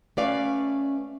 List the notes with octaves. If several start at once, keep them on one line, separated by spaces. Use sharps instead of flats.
A3 C#4 B4 D5 E5 F5